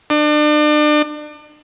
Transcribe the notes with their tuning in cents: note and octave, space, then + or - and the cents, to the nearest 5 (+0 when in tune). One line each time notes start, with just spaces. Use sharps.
D4 +35